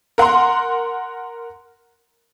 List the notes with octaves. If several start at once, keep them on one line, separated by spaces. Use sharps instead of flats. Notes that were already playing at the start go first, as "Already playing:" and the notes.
A#4 F#5 A#5 C6